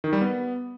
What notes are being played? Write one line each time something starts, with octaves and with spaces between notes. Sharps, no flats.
D#3
G3
B3